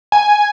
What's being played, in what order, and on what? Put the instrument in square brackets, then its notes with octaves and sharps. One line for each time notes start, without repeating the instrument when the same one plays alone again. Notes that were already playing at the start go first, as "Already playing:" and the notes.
[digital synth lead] G#5